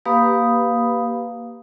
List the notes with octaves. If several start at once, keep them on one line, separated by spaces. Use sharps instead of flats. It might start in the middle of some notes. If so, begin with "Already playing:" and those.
A#3 G4 B4 F5 B5 D#6